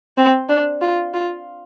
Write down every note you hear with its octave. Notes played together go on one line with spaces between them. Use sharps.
C4
D4
F4
F4